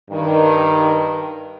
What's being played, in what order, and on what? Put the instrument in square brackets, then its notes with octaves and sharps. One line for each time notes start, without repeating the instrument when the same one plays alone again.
[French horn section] G2 D#3